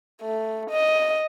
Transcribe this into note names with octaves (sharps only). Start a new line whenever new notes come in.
A3
D#5